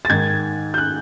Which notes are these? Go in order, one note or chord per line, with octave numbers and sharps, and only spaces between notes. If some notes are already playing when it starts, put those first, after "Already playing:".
A6
G#2 D#3 G#6
G6
F#6